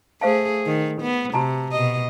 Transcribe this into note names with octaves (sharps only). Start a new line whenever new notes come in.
A3 G#4 C5 F5 A5
D#3
B3
C3 F#4 A5 A#5
B2 D#5